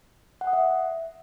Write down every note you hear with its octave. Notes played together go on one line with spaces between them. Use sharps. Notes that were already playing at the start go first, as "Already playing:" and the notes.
F#5
D#6
E5